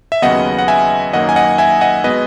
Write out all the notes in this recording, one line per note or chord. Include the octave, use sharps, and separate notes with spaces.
E5
D#2 C#3 F#3 B3 D#5 F#5
F#5
E5 G#5
F#2 D#3 F#3 A#3 D#5 F#5
G#5
D#5 F#5
E5 G#5
D#5 F#5
B2 G#3 B3 B4 D#5